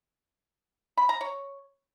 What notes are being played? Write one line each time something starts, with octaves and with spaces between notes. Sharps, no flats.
B5
A#5
C#5